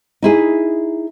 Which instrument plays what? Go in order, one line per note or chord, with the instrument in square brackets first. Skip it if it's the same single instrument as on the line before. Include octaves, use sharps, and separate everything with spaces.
[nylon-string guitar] D#4 E4 G#4